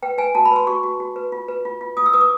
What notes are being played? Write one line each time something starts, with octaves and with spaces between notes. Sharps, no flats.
B4 G5
B4 G#5
F#4 A5
B5
B4 C6
F#4 C#6
F#4
F#4
B4
F4
B4
F4
F4
F4 D#6
E6
B4 D#6
D6